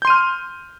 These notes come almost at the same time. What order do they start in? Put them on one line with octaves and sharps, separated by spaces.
G6 C6 D#7 F6